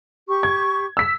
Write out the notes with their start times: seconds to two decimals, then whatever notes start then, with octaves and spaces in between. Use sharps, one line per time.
0.28 G4 C#6
0.43 G#6
0.97 E6 B6